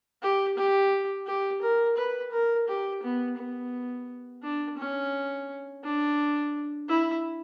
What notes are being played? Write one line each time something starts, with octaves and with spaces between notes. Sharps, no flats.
G4
G4
G4
A#4
B4
A#4
G4
B3
B3
D4
C#4
D4
E4